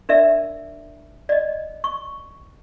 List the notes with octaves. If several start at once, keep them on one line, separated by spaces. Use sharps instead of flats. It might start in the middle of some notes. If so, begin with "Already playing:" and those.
D4 A#4 D5 E5
D5 D#5
C#6